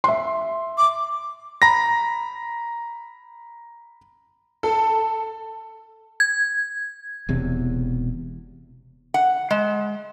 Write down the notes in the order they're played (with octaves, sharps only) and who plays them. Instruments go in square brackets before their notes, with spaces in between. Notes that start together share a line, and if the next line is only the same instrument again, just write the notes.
[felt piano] E5 C6
[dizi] D6
[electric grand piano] A#5 B5 A#6
[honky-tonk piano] A4
[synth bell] G#6
[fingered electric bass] E1 E2 C3
[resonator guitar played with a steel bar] F#5
G#3